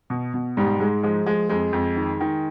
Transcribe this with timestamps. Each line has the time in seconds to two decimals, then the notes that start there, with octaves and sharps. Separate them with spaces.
0.10 B2
0.34 B2
0.57 G#2 G3
0.80 G#2 G#3
1.03 F3 G#3
1.26 F3 G#3
1.49 F2 G#3
1.73 F2
1.96 D#3
2.20 D#3